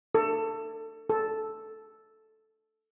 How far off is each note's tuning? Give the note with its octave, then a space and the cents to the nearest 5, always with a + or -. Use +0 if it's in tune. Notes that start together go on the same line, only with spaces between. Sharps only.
A4 +25
A4 -5